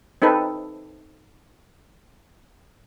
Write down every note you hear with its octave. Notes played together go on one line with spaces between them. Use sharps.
C4 D#4 A4 B4